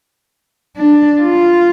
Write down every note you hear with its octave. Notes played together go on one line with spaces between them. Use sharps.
D4
F4